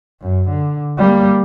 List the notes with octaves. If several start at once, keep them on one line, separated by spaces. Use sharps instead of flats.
F#2
D3
G3 A#3